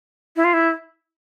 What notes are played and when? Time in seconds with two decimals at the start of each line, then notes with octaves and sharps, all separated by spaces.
0.36 E4
0.44 F4
0.54 E4